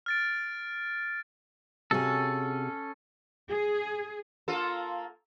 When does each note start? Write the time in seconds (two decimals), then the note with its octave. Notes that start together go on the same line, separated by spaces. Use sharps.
0.06 F6 A6 D7
1.91 C3 C#4 F#4 G#4 A4
3.48 G#4
4.48 A#3 F4 A4